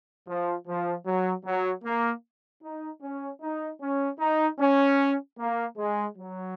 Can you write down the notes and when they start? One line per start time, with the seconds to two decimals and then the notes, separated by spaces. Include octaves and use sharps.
0.27 F3
0.66 F3
1.05 F#3
1.45 F#3
1.84 A#3
2.63 D#4
3.02 C#4
3.41 D#4
3.81 C#4
4.19 D#4
4.59 C#4
5.38 A#3
5.77 G#3
6.17 F#3